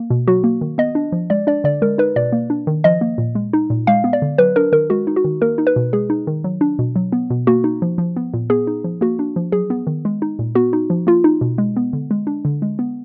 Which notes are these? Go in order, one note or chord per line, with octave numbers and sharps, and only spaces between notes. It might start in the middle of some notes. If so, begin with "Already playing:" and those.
Already playing: A#3
B2
F#3 F#4
A#3
D#3
B3 D#5
D4
F3
G#3 D5
D4 D5
D3 D5
G#3 A#4
D#4 B4
B2 D5
A#3
D4
D#3
F3 D#5
A#3
A#2
G#3
D#4
A#2
G#3 F5
B3
D5
D3
F#3 B4
D4 A#4
D#3 A#4
G#3 F#4
D#4
F#4
D#3
A#3 A#4
D#4
B4
B2
G#3 G#4
D#4
D#3
F#3
D4
B2
F#3
B3
B2
A#3 F#4
D#4
F3
F3
B3
A#2
B3 G#4
D#4
F3
A#3 F#4
D4
F3
F#3 G#4
B3
D#3
G#3
D#4
A#2
B3 F#4
D#4
F3
A#3 F4
D#4
B2
G#3
B3
D3
G#3
D4
D3
G#3
B3